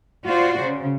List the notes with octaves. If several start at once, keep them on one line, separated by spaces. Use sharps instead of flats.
F4 F#4 C5 D5
C#3